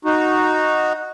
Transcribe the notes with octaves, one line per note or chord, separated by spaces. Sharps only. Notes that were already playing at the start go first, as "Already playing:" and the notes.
D#4 F#4